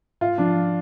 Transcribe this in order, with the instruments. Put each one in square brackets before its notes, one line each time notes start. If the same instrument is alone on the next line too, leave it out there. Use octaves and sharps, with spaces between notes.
[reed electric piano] G#2 [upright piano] F4
[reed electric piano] F3 [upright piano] D4
[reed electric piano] F3